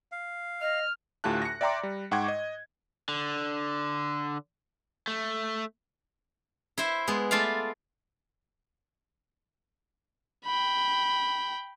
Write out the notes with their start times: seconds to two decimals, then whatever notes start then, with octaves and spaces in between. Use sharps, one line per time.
0.12 F5
0.61 D#5 F6
1.24 D2 A2 F4 G4 A5 F#6
1.42 A#6 C#7
1.61 D5 E5 G5 A#5 C6 D6
1.83 G3
2.11 G#2 F#5 G5 C#6 D6 G#6
2.28 D#5
3.08 D3
5.08 A3
6.78 E4 C5 E5
7.08 G#3 B3
7.31 A3 F4 D5 E5 F5
10.45 G5 B5